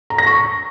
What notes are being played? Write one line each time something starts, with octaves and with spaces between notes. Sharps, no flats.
A#5
A#6
C#6